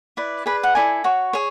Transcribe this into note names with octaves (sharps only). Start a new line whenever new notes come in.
E4 B4 D5
G#4 B4 D5 B5
F#5
E4 A4 D5 G#5
F#4 C#5
G#4 C#5